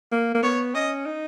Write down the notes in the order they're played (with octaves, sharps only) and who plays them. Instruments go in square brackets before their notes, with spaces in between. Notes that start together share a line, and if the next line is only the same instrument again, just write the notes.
[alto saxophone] A#3
A#3
[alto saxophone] B3 [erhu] C#5
[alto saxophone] C#4 [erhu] D#5
[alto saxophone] D#4